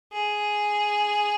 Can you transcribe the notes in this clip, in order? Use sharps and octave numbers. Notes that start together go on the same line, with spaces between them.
G#4